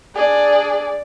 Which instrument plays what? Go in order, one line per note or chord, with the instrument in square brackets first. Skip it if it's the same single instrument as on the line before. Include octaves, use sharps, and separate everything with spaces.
[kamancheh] D4 G#4 [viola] D5